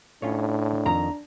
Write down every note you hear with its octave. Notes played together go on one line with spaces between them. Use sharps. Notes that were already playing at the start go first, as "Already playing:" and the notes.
A2 C#4 D4 F4 C#5
F2 D#3 A#5